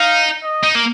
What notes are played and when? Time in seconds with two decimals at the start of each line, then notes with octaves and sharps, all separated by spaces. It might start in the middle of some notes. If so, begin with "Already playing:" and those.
Already playing: D#4 F5
0.43 D#5
0.63 D#4
0.75 A#3